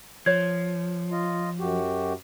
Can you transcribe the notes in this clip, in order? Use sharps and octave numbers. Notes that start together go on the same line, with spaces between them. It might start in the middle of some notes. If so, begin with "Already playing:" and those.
F3 C#5 G#6
F4 D#5
F#2 F#4 G4